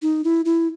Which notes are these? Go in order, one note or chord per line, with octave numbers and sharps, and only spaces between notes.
D#4
E4
E4